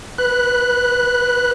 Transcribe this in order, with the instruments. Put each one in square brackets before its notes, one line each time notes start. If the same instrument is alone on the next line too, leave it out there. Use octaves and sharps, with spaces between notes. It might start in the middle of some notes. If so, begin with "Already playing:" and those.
[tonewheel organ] B4 F#6